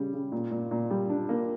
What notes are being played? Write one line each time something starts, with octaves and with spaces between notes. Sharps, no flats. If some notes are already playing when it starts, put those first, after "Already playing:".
Already playing: C#3 G3
C#3
A#2
A#2
A#2
G3
D4
A#3